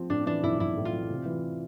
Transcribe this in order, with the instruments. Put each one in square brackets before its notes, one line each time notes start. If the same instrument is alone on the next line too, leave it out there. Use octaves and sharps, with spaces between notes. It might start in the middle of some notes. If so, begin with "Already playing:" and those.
Already playing: [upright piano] F3 [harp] C4
[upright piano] A2 [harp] D4
[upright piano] E3 [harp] D4
[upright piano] B1 [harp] E4
[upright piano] B1 [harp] E4
[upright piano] A2
[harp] F4
[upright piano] E3
C3
E3